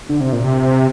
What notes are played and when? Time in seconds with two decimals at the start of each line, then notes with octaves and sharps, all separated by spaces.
0.09 D3
0.20 C3
0.33 A#2
0.44 C3